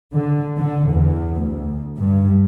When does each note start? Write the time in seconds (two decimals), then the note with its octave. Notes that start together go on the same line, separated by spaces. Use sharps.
0.13 D3
0.58 D3
0.89 E2
1.36 D2
1.98 G2